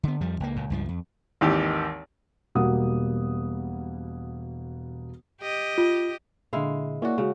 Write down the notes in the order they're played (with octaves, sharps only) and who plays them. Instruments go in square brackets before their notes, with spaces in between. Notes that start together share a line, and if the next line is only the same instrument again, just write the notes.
[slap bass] D3 B3
F2 F3 G3
C#2 A3 A#3
C#2 A#2
C#2 G2 F3
F2
[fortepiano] G#1 D#2 E3 G4
[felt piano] E1 B2 G3 A#3 F#5 D#6
[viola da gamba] G4 D#5
[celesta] F4
[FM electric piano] A#2 D3 [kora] G#3 E4 F5
[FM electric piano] A#3 E4 D5 [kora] C#4 F#4
[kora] C#3 [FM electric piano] G#3 F#4